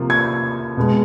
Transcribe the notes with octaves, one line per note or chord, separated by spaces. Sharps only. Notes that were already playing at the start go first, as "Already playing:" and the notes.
Already playing: C3 F3 A#3
G#6
B2 G#3